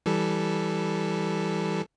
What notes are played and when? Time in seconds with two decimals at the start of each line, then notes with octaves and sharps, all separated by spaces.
0.06 E3 G3 A4